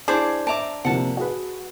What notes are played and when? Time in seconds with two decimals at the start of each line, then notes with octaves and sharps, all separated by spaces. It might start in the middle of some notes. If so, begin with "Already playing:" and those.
0.08 D4 E4 G#4 C5 A5 D6
0.47 E5 A5 A#5 D6 D7
0.85 C3 F3 A#3 F#5 A5
1.17 F#4 G#4 B4